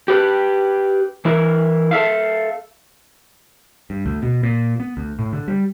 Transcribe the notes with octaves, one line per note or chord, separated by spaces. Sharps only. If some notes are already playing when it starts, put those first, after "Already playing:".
G4 B4
E3 E4 A#4
A4 E5 F5
G2
D2
B2
A#2
B3
D2
A2
D3
G3